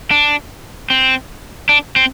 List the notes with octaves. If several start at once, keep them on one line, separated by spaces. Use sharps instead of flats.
D4
C4
D4
C4